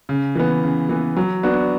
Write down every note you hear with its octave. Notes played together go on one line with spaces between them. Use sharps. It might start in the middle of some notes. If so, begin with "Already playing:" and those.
C#3
E3 B3
C#3
E3 B3
F#3
B3 D4 F#4